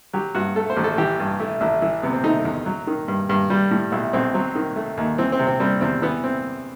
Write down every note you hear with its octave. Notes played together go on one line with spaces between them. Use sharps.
F#3 G4
G2 F#4
A3 A4
C5
A1
A4
E3 G4
G2
A3 E4
A1 E4
E3 E4
C3 B3
C4
A3 D#4
E2
F#3
D#3
G2
G2
G3
A2
B1 E4
B1 C4
F#3 C4
D#3
A3
D#2
E3 C4
C4
C3
C4
G3 C4
E2 C4
E3 B3
C4